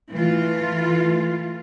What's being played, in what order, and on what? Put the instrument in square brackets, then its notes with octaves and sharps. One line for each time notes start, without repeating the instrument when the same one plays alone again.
[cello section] E3 A3 F4